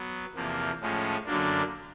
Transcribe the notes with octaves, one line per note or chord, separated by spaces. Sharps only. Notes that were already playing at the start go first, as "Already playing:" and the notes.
Already playing: F#3 B3
E2 C3 F3 A#3
A2 F3 G#3 C#4
F#2 D3 F#3 A#3 D4